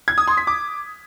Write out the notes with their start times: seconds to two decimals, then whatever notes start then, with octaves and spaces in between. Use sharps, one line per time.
0.08 G#6
0.18 D#6
0.28 C6
0.37 B6
0.47 D6